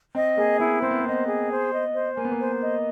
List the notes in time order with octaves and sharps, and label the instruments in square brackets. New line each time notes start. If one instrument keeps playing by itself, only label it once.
[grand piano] C4 [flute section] D#5
[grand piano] A#3 [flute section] G#4
[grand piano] B3 [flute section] E4
[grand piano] C4 [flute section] C5
[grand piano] B3
A#3
[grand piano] B3 [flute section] D#5
[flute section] G#4
C5
D#5
C5
[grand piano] A#3 [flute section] G#5
[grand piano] B3
A#3
[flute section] C5
D#5